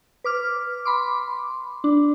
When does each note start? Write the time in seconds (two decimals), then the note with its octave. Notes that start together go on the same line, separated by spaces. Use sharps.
0.24 B4 D6 F6
0.85 B5 C6 D6
1.84 D4